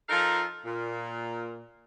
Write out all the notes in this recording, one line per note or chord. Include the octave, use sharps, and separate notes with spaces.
F3 D#4 F4 A4 A#4 F5
A#2